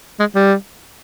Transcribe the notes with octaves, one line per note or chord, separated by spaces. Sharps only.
G#3
G3